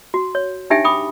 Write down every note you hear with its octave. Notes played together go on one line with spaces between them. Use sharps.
F#4
C#5
D4 D#4 G4 E5 G5 A5
G5 B5 D6 D#6